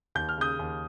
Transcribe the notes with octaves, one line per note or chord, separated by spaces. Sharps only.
D#2 G6
F6
C#3 D#6 G6
D#2